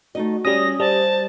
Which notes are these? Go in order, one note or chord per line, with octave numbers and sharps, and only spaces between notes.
A3 D#4 F#4 D#5
G3 C#4 D#6 A#6
G3 C5 E5 A5